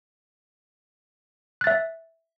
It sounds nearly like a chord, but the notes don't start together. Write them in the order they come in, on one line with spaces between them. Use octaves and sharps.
F#6 A6 E5